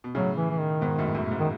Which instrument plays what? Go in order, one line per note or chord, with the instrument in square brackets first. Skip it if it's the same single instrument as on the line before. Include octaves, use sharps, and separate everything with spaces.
[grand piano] B2
[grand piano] A2 C#3 [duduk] F#3
[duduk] E3
E3
D#3
[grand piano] G#2 B2
F#2 A2
F#2 A2
G#2
[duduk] D#3